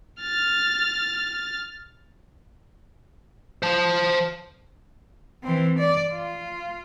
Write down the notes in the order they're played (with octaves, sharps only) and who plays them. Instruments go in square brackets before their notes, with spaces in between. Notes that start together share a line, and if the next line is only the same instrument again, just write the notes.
[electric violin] F6 A6
[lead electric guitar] C5 A5
[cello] E3 C4
D5
F4